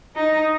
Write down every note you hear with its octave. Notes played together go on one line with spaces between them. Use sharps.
D#4